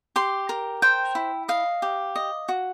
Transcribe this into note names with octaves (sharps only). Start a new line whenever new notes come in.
G4 C6
A#4
C5 G5
E4
D#5 F5
G4
D#5
F#4